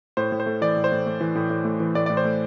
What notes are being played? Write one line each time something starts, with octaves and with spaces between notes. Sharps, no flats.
A2 C5
A2
C5
A3
E3 D5
A2
C5
A2
A3
E3
A2
A2
A3
E3
A2 D5
A2 D5
C5
A3